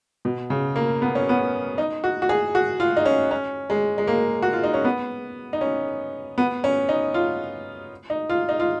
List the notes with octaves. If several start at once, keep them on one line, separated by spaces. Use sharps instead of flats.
B2
C#3
A#3
B3
C#4
B3
D#4
F#4
F#4
G#4
F#4
F4
D#4
C#4
C#4
G#3
G#3
A#3
F#4
F4
D#4
C#4
B3
D#4
C#4
B3
C#4
D#4
F4
D#4
F4
D#4
F4